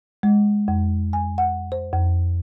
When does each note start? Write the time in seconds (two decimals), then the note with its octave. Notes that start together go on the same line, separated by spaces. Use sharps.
0.23 G#3
0.68 F2
1.13 G#5
1.38 F#5
1.72 C5
1.93 F2